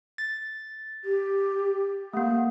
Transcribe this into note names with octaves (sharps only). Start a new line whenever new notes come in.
A6
G4
A3 A#3 F#5